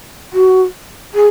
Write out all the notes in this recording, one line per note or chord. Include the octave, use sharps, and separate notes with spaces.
F#4
G#4